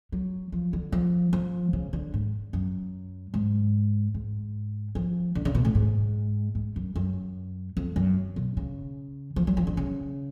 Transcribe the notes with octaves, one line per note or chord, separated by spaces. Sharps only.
F#3
F3
D3
F3
F3
C#3
D3
G#2
F#2
G#2
G#2
F3
D3
C#3
B2
A2
G#2
G#2
F#2
F#2
F2
F#2
B2
C#3
F3
F#3
F3
D3
C#3